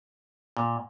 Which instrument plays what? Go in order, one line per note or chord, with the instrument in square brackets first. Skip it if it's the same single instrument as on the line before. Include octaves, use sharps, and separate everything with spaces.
[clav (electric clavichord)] A#2